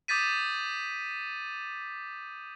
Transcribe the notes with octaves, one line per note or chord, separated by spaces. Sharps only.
D6 D#6 G6 A6 B6 D#7